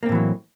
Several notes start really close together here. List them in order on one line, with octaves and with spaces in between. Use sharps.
A#3 C4 A2 E3 F#3